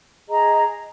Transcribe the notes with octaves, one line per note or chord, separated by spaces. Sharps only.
G#4 D#5 A#5